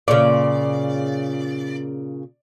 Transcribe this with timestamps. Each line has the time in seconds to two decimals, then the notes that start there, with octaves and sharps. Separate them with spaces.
0.08 A#2 C#3 D5